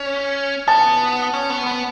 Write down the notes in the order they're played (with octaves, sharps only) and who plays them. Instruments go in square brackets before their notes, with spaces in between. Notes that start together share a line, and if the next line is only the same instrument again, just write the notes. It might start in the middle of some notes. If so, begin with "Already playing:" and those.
Already playing: [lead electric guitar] C#4
[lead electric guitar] B3 [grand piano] A5
[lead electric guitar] C#4
B3
B3